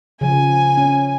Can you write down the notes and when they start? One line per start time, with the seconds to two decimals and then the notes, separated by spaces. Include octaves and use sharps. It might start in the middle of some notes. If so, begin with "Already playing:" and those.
0.21 C#3 F3 G#5
0.77 C#4